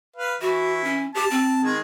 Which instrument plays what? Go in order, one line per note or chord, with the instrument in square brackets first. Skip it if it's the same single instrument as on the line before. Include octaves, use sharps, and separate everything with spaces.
[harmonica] B4 F5
[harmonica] E3 E4 [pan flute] F#4
[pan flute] C#4
[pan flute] G4 [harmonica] A5
[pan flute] C4
[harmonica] D#3 G#3 G#4